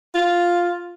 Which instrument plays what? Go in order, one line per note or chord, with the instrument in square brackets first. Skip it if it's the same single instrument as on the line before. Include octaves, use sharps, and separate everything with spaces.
[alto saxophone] F4